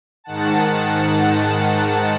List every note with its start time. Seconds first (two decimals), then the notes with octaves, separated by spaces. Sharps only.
0.24 G#2 D#3 F#5 A5